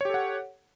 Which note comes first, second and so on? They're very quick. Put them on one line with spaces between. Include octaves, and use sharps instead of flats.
C#5 G4 A4 F#5